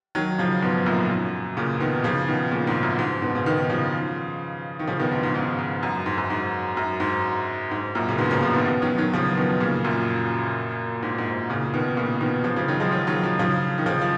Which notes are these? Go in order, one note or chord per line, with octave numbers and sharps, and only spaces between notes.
D#3 F#3
C#3 F3
G#2 B2
F#2 A#2
F#2
A#2 C#3
B2 D#3
C#3 F3
B2 D#3
A#2 C#3
G#2
F#2
G#2
G#2 B2
C#3
B2 D#3
C#3 F3
D#3
C#3 F3
B2 D#3
G#2
G#2
G#2
G#2
F#2
G#2
F#2
G#2
F#2
G#2
G#2
F#2 A#2
C#3
G#2 B2
A#2 C#3
C#3 F3
B2 D#3
B2 D#3
D#3 F#3
D#3 F#3
C#3 F3
B2 D#3
A#2 C#3
F#2 A#2
G#2
G#2
A#2 C#3
B2 D#3
A#2 C#3
B2 D#3
C#3 F3
C#3 F3
D#3 F#3
F3 G#3
D#3 F#3
D#3 F#3
C#3 F3
C#3 F3
D#3
C#3 F3
F3